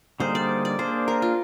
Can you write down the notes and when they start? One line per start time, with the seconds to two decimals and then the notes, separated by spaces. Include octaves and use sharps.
0.20 D3 G3 A#3 D#4 G#4 C5
0.35 D5
0.65 D5
0.79 A#3 D4 G#4 C5
1.08 A#4
1.22 F4